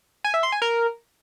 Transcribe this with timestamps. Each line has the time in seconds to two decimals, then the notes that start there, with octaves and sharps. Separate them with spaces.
0.24 G#5
0.34 E5
0.43 C6
0.52 G#5
0.62 A#4